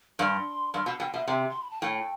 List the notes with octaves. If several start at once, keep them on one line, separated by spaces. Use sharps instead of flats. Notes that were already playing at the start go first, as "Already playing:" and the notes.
G2 C6
G2 C6
B2 B5
B2 G5
B2 E5
C3 E5
C6
B5
A5
A2 G5